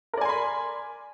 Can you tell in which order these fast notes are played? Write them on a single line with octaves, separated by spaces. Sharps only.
A#4 D5 G#5 C6 B5